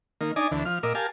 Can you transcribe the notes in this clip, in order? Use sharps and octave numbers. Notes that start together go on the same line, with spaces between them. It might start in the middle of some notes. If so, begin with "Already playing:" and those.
D#3 A#3
D4 D#4 D5 D#5 G#5
D2 D3 E3
F3 F6
A#2 A#4 D#5 D6 E6
G4 A#4 F5 G#5 A5